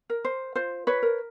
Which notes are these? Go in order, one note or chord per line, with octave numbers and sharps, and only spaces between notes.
A#4
C5
F4 C5
B4 C#5
A#4